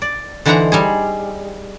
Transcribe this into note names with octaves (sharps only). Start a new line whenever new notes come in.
D5
D3 E3 D#4 C5 F#5 A#5
G3 D#4 G#4